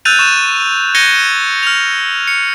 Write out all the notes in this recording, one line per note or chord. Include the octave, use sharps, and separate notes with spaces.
E6 F#6 G6 A6 D#7 F7
C#6 E7
G6 G#6 A#6 C#7 D#7 G7
F6 F7
C#7